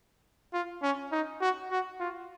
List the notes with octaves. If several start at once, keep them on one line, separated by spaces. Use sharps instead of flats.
F4
C#4
D#4
F#4
F#4
F4